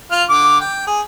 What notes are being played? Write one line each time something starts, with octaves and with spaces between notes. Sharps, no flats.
F4 F6
D3 D6
G5
G#4